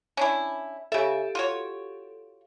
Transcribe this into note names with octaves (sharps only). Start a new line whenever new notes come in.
C#4 D4 E4
C#3 G4 A4 E5
F4 F#4 C#5